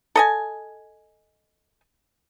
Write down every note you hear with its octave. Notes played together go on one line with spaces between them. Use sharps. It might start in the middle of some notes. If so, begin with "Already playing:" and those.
A4 D#5 G#5